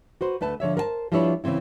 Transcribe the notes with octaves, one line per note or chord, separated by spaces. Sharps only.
F#4 B4 C5
D2 A3 B4 A5
D3 F3 C#5 E5
A#4 C5 G5 A5
F3 G3 D4 E4 B4 C#5
C#3 E3 C4 E4